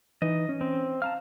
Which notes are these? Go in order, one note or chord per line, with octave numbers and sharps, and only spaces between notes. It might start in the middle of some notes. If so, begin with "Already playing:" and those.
E3 D#4 B4 D#5
C#4
C4
F5 A5 A#5 F6